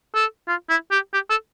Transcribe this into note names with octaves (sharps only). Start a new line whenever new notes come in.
A4
F4
E4
G4
G4
A4